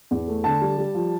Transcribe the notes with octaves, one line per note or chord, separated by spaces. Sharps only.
E2
A3
D3 A5
G3
G3
F3